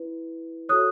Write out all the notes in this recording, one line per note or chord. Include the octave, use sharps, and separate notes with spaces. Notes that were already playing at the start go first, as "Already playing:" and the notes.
Already playing: E4 B4
F#4 A4 C#5 D#6 F#6